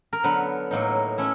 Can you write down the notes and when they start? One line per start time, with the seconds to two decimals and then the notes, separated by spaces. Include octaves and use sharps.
0.13 A#4
0.24 D3 F#3 B3 B4
0.71 A2 F#3 A#3 D#4
1.18 A3 C#4 E4